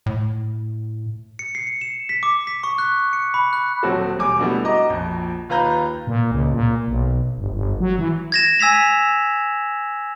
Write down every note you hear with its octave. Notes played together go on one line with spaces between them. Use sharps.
A2
C#7
C7
C#7
E7
B6
D6
B6
C#6
F#6
C#7
B5
F#6
D#1 F#3 C4 F#4 A4
E1 G3 G#5 D6
G3 A3 B3 D4 E4 F#4
F#4 D#5 A#5 D6
A#1 F2
D#2 F4 B4 A#5 G6
A#2
C#2
A#2
B1
G1
G1
F#3
E3
G#6 A#6 E7
G#5 E6 G#6 B6 F7